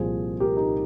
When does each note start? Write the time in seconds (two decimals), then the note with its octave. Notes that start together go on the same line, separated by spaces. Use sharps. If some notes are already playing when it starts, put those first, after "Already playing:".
Already playing: C2 A#2 F3 G#4 C5
0.40 G4 A#4
0.57 D#4 G4